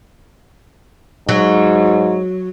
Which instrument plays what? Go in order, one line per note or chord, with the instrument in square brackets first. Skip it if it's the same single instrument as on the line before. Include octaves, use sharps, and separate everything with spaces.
[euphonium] G#2 [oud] F#3